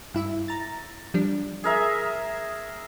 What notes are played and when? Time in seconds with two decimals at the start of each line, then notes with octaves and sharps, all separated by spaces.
0.14 G2 E4 E5
0.48 A#5 A6
1.14 F3 G3 D4
1.64 G#4 A#4 E5